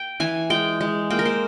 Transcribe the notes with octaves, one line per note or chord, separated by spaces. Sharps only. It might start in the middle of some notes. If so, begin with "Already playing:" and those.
Already playing: G5
E3 G#5
G#3 G5
G#3
A#3 G5
A#4
C5